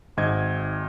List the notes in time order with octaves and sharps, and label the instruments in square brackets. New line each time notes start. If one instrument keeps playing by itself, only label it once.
[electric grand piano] G#1 G#2 D#5 G#6